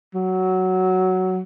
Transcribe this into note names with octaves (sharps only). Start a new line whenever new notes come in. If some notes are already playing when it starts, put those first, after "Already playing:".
F#3